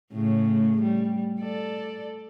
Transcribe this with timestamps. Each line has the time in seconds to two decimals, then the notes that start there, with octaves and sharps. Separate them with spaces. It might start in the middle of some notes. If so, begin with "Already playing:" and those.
0.13 A2 C#3
0.82 G3
1.41 A4 D5